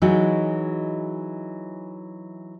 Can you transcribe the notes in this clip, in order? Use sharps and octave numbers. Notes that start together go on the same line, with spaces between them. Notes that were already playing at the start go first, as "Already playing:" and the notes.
E3 F#3 G#3 D#4 F#4